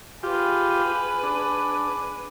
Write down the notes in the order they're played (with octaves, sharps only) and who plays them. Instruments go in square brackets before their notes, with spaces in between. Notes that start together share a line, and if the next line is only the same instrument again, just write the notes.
[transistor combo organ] F4 G4 [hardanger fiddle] G#4 B4
[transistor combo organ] D4